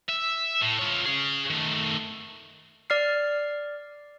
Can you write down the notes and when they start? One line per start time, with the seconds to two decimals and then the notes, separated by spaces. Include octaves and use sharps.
0.09 E5
0.62 A2
0.79 F4 C#5
1.06 C#4 G#4
1.50 D#3 A3
2.90 D5 F6 C7